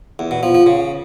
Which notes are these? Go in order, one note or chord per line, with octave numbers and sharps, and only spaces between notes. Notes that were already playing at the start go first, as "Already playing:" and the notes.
E2
B2
F3
F3
C#3